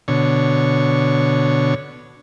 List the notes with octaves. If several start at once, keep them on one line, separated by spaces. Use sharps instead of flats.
B2 D3 C#5